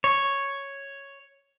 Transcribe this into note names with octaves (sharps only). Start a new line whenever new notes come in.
C#5